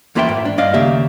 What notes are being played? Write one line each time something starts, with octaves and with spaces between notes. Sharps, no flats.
E2 A#3 F4 B4 E5 G5
G#2
D4
G2 D5 D#5 F5
D#2 C#3 A#3 G4 E5